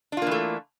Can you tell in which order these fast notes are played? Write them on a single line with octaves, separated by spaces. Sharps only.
D4 F4 A#3 E3 A3